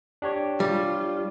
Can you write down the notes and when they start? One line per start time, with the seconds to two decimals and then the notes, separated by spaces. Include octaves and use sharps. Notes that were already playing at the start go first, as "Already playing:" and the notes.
0.22 D4 G4 C#5
0.60 G3 F4